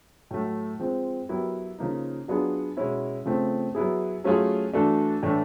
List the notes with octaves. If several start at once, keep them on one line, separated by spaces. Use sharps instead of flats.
A2 F#3 A3
F3 G#3 C4
F#3 B3 E4 G4 A#4
C#3 F3 A#3 D#4
F#3 B3 D4 F4 G#4
B2 G#3 C#4 E4
C#3 F3 A3 C4
F#3 B3 E4 G#4
F#3 A3 C#4 F4 G#4
E3 A3 D4 F#4 A4
A2 E3 A3 D4